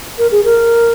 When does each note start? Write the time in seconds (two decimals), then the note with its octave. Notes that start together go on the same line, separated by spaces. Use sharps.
0.18 A#4
0.32 G#4
0.45 A#4